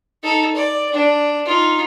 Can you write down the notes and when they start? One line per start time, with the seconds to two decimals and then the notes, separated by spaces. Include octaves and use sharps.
0.23 D#4 A4
0.55 D5
0.92 D4
1.45 D#4 F4